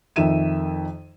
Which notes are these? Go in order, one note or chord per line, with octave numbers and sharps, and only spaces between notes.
F2 D#3 D#4 E5 D#7 E7